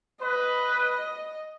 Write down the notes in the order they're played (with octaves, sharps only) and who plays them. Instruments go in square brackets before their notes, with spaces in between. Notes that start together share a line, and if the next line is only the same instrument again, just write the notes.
[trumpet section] B4 [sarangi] D#5